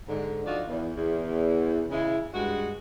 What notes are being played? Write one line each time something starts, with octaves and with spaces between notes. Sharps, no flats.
G#2 D3
F3 D4 D#4 F4 F#4 D5
E2
E2
C#3 G#3 E4
G2 G#3 F#4